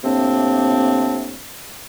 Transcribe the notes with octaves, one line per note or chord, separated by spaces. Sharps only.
A2 C3 A#3 C4 D4